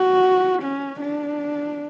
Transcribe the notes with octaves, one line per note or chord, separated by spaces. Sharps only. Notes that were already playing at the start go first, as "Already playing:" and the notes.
Already playing: F#4
C#4
D4